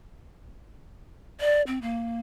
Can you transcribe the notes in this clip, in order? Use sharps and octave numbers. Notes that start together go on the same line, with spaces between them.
D5
C4
A#3